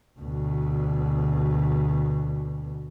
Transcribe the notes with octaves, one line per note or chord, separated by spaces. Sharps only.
D2 B2